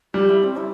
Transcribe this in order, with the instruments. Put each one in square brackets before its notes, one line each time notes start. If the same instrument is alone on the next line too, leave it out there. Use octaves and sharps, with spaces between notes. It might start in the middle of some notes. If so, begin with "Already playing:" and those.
[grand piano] G3 [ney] G4
[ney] E4
C4
E4